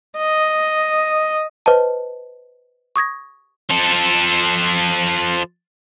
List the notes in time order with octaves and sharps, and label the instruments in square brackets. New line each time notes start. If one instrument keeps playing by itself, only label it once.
[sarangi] D#5
[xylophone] B4 C5 D#5 A5
C#6 D#6 G#6 A#6
[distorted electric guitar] F3 A4